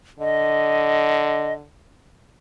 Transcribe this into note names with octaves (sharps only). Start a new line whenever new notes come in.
D3 D#5